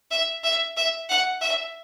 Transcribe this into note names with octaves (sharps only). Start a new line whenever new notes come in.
E5
E5
E5
F#5
E5